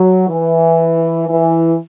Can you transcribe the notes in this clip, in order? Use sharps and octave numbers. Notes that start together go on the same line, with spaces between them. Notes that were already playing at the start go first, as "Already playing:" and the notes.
Already playing: F#3
E3
E3